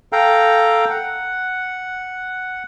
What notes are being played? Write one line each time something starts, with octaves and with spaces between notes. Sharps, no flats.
A4 F5 G5 A#5
F#5